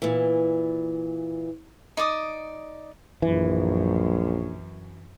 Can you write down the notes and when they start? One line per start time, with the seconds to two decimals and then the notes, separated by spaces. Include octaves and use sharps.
0.02 A#2 E3
1.97 D#4 D5 D6 D#6
3.22 A#1 F#2 E3